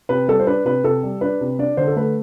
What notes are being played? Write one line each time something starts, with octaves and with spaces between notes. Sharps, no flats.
C3 B4
G3 A4
C5
D4 B4
C3 B4
C3 A4
G3
D4 B4
C3
D4 D5
D3 C5
A4
A3 B4